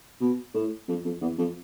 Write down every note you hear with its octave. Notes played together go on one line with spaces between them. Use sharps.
B2
A2
F2
F2
E2
F2